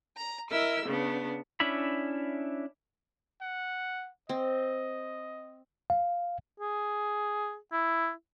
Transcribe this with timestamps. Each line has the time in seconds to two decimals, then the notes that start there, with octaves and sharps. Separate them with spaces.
0.17 A#5
0.51 E4 A#4 D#5 E6
0.86 C#3 B3 D4
1.60 C#4 D4 E4 E5 B5
3.41 F#5
4.29 C4 D#5
5.90 F5
6.60 G#4
7.72 E4